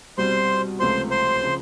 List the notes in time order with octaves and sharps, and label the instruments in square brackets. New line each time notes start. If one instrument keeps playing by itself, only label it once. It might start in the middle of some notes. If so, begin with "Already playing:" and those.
[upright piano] C2 B2 G3 [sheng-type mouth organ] C5 C6
[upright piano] C#2 C3 F3 A3 [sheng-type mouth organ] C5 C6
[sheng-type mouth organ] C5 C6
[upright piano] C#3 F3